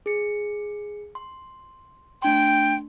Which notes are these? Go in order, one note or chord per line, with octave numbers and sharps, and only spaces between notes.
G#4 C#7
C6
A3 D4 G5 C6